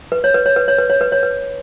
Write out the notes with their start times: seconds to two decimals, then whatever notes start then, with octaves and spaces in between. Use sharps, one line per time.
0.12 B4
0.24 C#5
0.34 B4
0.46 C#5
0.56 B4
0.68 C#5
0.78 B4
0.90 C#5
1.01 B4
1.12 C#5
1.23 B4